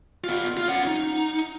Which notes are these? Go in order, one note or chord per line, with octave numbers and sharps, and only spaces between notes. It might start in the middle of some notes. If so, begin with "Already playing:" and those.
B3 F4
F4
C#4 F#5
D#4